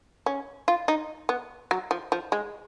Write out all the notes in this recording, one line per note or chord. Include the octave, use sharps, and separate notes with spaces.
C#4
F4
D#4
B3
F#3
F3
F3
G#3